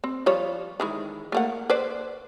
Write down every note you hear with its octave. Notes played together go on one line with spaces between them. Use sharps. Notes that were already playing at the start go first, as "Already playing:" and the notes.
C4
F3 G3 C#5
D#3 E3 G#3
A3 A#3 F#5
B4 C5 D5